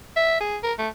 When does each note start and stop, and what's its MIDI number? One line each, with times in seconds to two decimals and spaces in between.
0.16 0.39 76
0.41 0.57 68
0.63 0.73 70
0.78 0.88 57